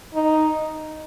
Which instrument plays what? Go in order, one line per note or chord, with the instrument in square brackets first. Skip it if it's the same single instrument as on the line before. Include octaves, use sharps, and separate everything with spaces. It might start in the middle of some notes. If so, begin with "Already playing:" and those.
[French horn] D#4